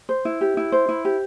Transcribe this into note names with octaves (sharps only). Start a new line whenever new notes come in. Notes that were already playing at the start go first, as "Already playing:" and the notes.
C5
E4
G4
E4
C5
E4
G4